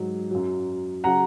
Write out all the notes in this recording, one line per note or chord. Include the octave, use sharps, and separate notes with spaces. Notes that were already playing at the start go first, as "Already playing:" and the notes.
Already playing: G#2 F#3
F#2 F#3
C#3 F#3 F#5 A#5